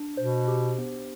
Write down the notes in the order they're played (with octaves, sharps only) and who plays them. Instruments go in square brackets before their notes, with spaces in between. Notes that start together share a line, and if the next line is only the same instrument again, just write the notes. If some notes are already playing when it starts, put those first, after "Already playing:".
Already playing: [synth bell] D4
[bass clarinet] B2 [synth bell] C5
[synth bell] G4
B3